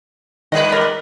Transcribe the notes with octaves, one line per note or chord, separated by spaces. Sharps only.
A#2 D#3 G3 B4 D#5
A#4 D#5 D6